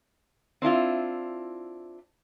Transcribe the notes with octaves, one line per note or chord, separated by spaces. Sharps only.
C4 D4 E4 F4